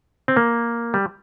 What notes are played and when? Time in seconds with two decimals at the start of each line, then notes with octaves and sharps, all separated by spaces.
0.28 C4
0.37 A#3
0.94 G3